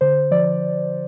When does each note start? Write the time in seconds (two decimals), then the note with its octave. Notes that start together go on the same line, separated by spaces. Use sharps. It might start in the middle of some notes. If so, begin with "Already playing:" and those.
0.01 D3 C5
0.31 F3 D5